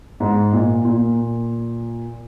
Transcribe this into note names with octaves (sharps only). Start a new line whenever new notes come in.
G#2
A#2
A#2